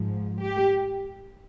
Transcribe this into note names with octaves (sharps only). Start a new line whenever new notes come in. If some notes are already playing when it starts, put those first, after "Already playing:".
Already playing: G#2 F3
G4